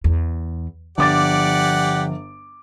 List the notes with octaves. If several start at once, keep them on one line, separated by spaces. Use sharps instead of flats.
E2
G1 F3 G4 D5 F#5 D6 A6